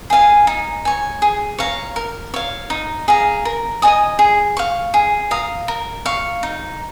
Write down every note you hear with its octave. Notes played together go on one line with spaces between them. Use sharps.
G#4 F5 G#5
D#4
C#5 G#5
G#4
C#5 F5 A#5
A#4
C#5 F5
D#4
G#4 F5 A#5
A#4
D#5 G#5 D#6
G#4
F5 C#6
G#4
F5 A#5 D#6
A#4
F5 C#6
D#4